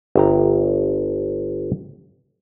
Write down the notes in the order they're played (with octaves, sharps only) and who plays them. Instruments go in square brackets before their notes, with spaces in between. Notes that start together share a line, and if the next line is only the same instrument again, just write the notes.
[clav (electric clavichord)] G1 E5 G5 A#5